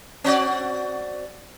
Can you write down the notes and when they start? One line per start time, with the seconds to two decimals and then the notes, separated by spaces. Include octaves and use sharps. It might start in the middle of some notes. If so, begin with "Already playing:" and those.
0.24 C4 F#4 D5